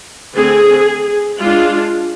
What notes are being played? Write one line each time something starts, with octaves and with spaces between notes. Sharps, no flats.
D3 A3 C4 G#4
G#3 D4 F4